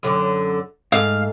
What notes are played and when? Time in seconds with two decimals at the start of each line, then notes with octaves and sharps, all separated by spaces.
0.03 F#2 D3
0.92 G#2 A3 F5